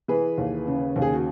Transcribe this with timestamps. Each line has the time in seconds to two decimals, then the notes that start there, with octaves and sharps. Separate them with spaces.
0.08 E3 G#4 B4
0.38 D#2
0.67 C#3
0.96 D#2
1.02 G#4
1.13 F#4